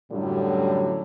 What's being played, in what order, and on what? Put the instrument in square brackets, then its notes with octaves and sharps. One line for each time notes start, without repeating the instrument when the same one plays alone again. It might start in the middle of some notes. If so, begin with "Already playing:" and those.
[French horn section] F#2 A2 D3 F#3 G3